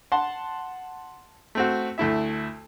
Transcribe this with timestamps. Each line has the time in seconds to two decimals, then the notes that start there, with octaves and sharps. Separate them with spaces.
0.12 F#5 A5 C6
1.55 A3 C4 F#4
1.98 D2 A3 E4 E5